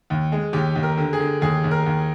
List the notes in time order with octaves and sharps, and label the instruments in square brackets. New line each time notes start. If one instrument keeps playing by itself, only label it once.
[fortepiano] D#2
G#3
[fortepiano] D#2 [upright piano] G4
[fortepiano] D#2
[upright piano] A#4
[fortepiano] D3
[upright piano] G#4
[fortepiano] D3
[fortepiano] D#2 [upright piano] G#4
[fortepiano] D#2
[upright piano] A#4
[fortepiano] D#2